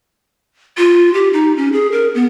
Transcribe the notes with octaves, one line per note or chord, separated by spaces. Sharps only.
F4
G4
D#4
C#4
G#4
A#4
B3